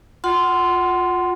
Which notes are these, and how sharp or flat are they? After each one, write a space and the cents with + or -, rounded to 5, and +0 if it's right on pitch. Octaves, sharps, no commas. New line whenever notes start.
F4 +20 F#5 +15 C6 -10